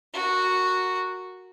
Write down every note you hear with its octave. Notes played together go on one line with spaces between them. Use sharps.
F#4 A#4